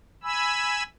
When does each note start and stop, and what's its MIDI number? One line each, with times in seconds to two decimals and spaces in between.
0.23 0.83 80
0.23 0.83 83
0.23 0.83 88